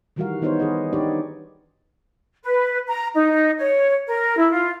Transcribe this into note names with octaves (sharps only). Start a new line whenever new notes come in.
D#3 E3 G3 F#4 A#4 F5
D#3 B3 D#4 F#4 C5 C#5
D#3 G#4 B4 D#5
D4 D#4 G4 C#5 D5
B4
A#5
D#4
C#5
A#4
E4
F4